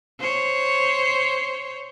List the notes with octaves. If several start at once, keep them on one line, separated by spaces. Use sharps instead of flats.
C5 C#5